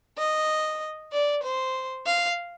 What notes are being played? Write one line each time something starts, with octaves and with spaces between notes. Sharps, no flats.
D#5
D5
C5
F5